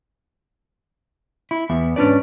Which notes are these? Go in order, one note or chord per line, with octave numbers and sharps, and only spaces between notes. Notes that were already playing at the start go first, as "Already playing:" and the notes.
E4
E2 B3 E5
G#2 C#4 D4 B4 D5